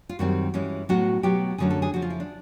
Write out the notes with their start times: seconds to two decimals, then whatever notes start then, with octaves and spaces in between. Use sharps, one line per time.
0.09 F4
0.19 F#2 D#3 G3 C4 F#4
0.54 G2 E3 G#3 C#4
0.89 A2 F#3 B3 F#4
1.23 B2 F#3 B3 G4
1.58 F#2 D3 F#3 A3 C#4 G#4
1.70 A4
1.82 G#4
1.94 F2 C#3 F3 F#4
2.02 F4
2.10 E4
2.20 D4